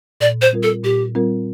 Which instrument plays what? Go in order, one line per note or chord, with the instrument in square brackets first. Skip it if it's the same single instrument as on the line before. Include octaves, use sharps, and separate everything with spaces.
[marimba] A#2 [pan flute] D5
[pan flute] C5
[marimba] G3 C4 F4 A#4
[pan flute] A4
[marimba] A#2 [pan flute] G4
[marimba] G3 C4 F4 A#4